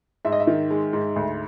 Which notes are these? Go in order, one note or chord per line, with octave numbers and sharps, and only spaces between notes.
G#2 E5
D#5
E5
D#3
G#3
G#2
D2